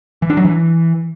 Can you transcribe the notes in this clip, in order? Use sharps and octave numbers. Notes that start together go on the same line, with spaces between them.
E3
D4
F#3
E3